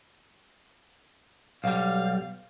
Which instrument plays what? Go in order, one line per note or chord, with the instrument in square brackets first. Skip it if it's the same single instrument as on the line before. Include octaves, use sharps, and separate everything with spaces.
[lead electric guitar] B1 G3 [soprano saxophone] F5